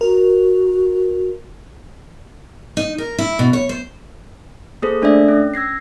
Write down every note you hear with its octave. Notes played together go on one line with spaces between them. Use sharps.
F#4 A#4
D#4
A#4
E4
B2
C#5
C5
A#3 G#4 A4 C5
A3 D4 A4 D5 E5
C#4
E6 G#6 A#6 C7